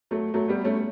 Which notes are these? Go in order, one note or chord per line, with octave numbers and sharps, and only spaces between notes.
F#3 A3
F#3 A3
G3 B3
A3 C#4